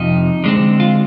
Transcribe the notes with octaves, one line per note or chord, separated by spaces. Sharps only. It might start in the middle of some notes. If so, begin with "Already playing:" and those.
Already playing: F2 C3 F3 D#4
D3 G#3 C4
F4